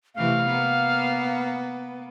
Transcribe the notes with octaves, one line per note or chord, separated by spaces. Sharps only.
C3 E3 A3 F5
A#3 B3